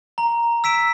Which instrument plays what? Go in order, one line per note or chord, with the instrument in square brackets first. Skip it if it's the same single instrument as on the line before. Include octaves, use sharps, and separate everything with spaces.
[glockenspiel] A#5
E6 B6 D7 E7